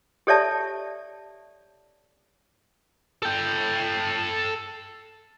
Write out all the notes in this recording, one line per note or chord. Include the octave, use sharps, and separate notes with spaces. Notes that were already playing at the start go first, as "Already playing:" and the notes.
G4 A4 C#5 D5 E5 A5
A4 G5